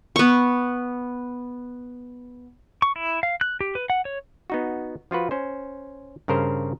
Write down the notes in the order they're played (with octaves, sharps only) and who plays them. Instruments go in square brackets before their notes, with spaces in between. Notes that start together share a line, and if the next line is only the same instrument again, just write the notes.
[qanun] B3 C#6
[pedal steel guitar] C#6
E4
F5
F#6
G4
B4
F#5
C#5
[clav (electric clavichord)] B3 D#4 F#4
F3 F4 F#4 B4
C#4 C5
G2 C#3 A#4 C5